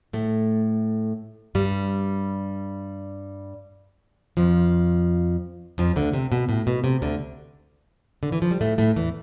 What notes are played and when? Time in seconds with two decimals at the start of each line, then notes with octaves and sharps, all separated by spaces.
0.13 A2 A3
1.55 G2 G3
4.37 F2 F3
5.78 F2 F3
5.96 D2 D3
6.13 C3
6.32 B2
6.49 A2
6.67 B2
6.84 C3
7.02 D2 D3
8.23 D3
8.32 E3
8.42 F3
8.51 G3
8.61 A2 A3
8.78 A2 A3
8.96 E2 E3